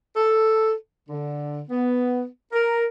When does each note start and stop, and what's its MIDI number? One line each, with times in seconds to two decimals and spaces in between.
0.15 0.72 69
1.09 1.59 50
1.69 2.24 59
2.52 2.84 70